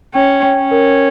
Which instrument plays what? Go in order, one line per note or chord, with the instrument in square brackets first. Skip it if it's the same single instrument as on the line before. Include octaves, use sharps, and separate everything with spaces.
[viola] C#4 [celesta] G5
[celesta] G5
[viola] C#4
[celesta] A#4